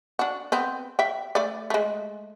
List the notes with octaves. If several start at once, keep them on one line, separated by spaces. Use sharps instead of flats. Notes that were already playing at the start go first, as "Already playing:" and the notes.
D4 F#4
B3 C4
E5 G5
A3 D5
G#3 A3